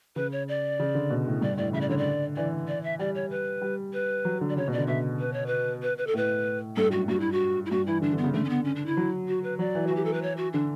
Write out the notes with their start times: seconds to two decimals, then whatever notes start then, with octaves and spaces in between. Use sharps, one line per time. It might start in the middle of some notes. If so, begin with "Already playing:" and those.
0.16 C#3 B4
0.32 C#5
0.48 D5
0.80 C#3
0.95 D3
1.10 B2
1.26 A2
1.42 G2 D5
1.57 A2 D5
1.73 C#3 E5
1.81 D5
1.89 D3 C#5
1.97 D5
2.36 E3 D5
2.68 D5
2.84 E5
2.99 G3 D5
3.15 C#5
3.30 B4
3.62 G3
3.93 B4
4.25 F#3
4.41 D3
4.50 D5
4.56 C#3 C#5
4.68 B2
4.72 D5
4.78 D3
4.88 B2 E5
5.20 B4
5.33 C#5
5.47 B4
5.83 B4
5.98 B4
6.07 A4
6.14 A2 B4
6.77 G2 A4
6.92 F#2 F#4
7.08 G2 F#4
7.20 E4
7.32 F#4
7.66 E4
7.71 G2 F#4
7.87 E3 E4
8.02 D3 D4
8.13 D3
8.18 B3
8.24 C#3
8.34 D3 A3
8.44 C#4
8.49 B3
8.65 C#4
8.76 D4
8.86 E4
8.97 F#3
9.28 F#4
9.43 B4
9.59 F#3 D5
9.75 E3
9.87 F#4
9.91 E3 G4
10.05 A4
10.13 B4
10.22 C#5
10.37 F#4
10.53 D3 D4